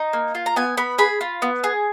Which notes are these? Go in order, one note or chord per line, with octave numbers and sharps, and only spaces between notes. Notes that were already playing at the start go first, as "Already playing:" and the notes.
Already playing: D#4
A#3
F4
A#5
B3 G#5
B3 B5
G#4 B5
F4
B3
G#4